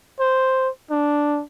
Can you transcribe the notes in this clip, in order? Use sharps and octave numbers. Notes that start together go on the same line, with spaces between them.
C5
D4